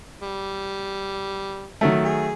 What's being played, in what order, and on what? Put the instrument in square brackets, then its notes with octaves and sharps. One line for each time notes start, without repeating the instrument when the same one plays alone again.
[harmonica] G3
[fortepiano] D#3 F#3 A3
[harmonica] G#4